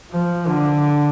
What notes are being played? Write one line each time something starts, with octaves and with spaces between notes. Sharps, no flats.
F3
D3